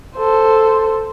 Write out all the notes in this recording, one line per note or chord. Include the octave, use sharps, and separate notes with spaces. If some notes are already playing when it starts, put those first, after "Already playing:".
A4 C5